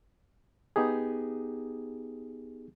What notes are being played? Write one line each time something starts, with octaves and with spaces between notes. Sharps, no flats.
B3 D#4 G4 G#4